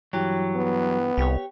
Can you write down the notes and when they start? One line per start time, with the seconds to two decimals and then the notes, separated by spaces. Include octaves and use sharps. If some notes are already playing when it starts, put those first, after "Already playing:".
0.13 G2 E3 F#3 G4
0.55 B3
1.18 C2 G4 C#5